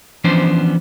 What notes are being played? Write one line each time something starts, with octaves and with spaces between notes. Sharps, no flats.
E3 F3 B3 C#4 D4 C5